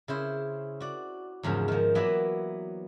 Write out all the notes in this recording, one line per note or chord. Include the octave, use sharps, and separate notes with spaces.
C#3 E4 C5
F#4 D5
E2 G#2 C#3 F3
D#3 F3
E3 F#3 A#3 B3 D5 E5